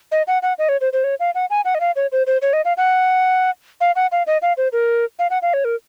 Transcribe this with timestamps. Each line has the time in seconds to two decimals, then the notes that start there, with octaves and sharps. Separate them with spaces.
0.12 D#5
0.28 F#5
0.43 F#5
0.58 D#5
0.69 C#5
0.81 C5
0.93 C5
1.04 C#5
1.20 F5
1.35 F#5
1.50 G#5
1.65 F#5
1.75 D#5
1.80 F5
1.96 C#5
2.12 C5
2.27 C5
2.42 C#5
2.53 D#5
2.65 F5
2.77 F#5
3.81 F5
3.96 F#5
4.12 F5
4.27 D#5
4.42 F5
4.57 C5
4.73 A#4
5.19 F5
5.30 F#5
5.42 F5
5.54 C#5
5.65 A#4